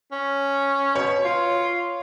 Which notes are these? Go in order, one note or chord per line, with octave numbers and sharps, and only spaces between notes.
C#4
B2 C#5
F4